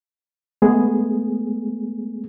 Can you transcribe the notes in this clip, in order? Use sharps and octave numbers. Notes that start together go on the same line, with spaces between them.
G#3 A3 B3 G#4